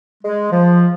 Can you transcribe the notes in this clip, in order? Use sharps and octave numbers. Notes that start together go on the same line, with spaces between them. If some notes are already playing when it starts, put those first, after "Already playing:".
G#3
F3